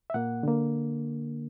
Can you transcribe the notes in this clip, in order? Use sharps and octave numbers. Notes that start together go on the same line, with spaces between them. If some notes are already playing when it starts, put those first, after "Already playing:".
E5
A#2 A#3 F#5
D3 A#3